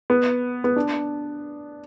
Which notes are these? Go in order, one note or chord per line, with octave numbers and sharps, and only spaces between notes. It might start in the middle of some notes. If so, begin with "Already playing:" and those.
B3
B3
D4